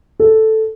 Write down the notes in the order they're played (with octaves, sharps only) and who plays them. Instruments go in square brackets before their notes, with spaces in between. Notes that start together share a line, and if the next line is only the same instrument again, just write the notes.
[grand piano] A4